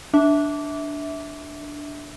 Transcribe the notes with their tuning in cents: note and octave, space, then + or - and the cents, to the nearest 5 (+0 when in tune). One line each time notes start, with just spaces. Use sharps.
D4 +0 E5 -15 D6 -20